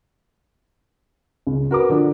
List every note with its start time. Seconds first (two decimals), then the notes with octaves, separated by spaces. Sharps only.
1.47 C#2
1.71 F#4 A#4 B4 D6
1.90 D3 F3 D4